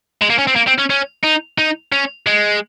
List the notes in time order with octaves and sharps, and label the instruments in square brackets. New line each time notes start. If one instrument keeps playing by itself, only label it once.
[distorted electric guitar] G#3
A#3
C#4
C4
A#3
C4
C#4
C#4
D#4
D#4
C#4
G#3